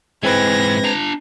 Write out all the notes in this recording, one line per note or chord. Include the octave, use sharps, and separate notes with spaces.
G#2 E3 G#3 C4 B4 G#6 A#6
D4 A#5